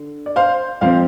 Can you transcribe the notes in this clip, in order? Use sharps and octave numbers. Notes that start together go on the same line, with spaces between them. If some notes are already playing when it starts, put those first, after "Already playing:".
Already playing: D3
D5
C5 F5
F2 F3 C4 C5 F5